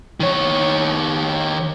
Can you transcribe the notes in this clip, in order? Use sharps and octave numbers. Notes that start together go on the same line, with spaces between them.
D#3 C#5